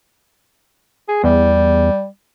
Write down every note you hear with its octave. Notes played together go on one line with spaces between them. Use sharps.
G#4
E2 G3